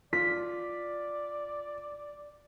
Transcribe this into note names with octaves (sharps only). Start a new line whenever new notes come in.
F4 D5 B6